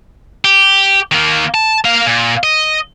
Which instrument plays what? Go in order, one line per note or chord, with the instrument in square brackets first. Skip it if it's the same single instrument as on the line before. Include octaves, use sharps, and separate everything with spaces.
[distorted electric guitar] G4
D#3 A#3
A5
A#3 F5
A#2
D#5